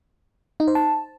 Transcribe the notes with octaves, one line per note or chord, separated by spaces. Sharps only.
D#4
C5
A5